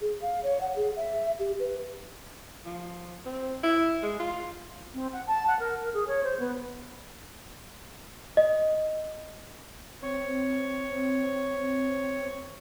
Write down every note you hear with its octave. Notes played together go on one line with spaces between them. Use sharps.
G#4
F5
C#5
F#5
G#4
E5
G4
B4
F3
C4
E4
G#3
F4
C4
F#5
A5
F#5
A#4
A#4
G#4
C#5
C5
B3
D#5
C4 C#5